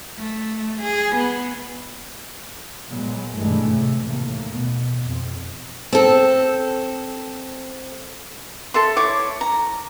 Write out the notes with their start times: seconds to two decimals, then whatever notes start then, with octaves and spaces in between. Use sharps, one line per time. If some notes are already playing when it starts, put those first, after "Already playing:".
0.18 A3
0.82 G#4
1.16 B3
2.89 A#2 F#3 G#3 B3
3.36 B1 G2 D#3 E3 G#3 A3
3.70 F1 A2 C3
4.04 A1 D#2 A3 A#3
4.49 B2
5.05 F2
5.93 C4 A4
8.74 A4 E5 C6
8.96 E4 C#5 D6
9.41 A#5